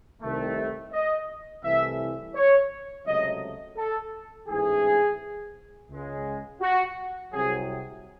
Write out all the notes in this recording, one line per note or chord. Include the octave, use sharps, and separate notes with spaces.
C2 C3 D#3 A3
D#5
C2 C3 E3 A3 E5
C#5
C#2 C3 F#3 A3 D#5
A4
A1 G#2 E3 A3 G#4
C#2 C#3 G#3
F#4
C2 C3 F#3 G#4